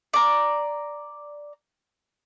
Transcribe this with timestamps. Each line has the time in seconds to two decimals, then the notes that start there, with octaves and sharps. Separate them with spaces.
0.14 D5 A#5